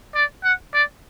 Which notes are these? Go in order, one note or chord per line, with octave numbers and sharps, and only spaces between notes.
D5
F#5
D5